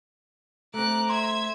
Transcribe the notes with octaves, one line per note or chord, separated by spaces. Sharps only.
A3 C4 A#5 D6 F#6
E5 C6 G#6